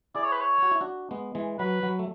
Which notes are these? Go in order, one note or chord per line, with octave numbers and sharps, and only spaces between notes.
E4 G#4 D5
C#5
B4
C#5
F#4
E4
D4 F#4
G#3 B3
E3 G#3
F#3 B4
F#3
A3